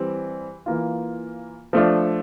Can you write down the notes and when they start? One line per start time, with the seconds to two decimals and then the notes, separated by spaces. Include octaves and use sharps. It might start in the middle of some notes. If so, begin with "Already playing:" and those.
Already playing: E3 G3 C4
0.66 E3 A#3 F4
1.73 F3 A3 D4 F4